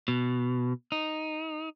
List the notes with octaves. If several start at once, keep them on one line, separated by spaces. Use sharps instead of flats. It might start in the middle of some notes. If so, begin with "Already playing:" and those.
B2
D#4